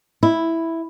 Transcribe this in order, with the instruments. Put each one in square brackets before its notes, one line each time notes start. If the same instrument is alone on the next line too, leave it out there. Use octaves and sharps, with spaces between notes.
[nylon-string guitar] E4